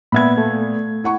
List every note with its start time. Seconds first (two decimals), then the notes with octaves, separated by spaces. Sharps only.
0.12 A#2 B3 E5 B5 G#6
0.38 A3
1.04 E4 F#5 C#6